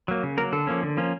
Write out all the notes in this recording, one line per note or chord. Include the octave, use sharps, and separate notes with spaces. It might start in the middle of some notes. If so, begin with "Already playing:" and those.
F#3 A#3
C#3
F#3 A#3 A#4
D3 A4
F3 A#3 C#4
D3
F3 A#3 C#4